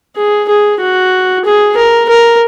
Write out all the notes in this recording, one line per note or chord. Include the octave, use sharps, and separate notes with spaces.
G#4
G#4
F#4
G#4
A#4
A#4